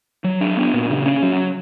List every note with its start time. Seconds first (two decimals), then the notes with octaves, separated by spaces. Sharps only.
0.24 F#3
0.41 D4
0.57 B3
0.74 A#2
0.90 C#3
1.06 C#4
1.22 F#3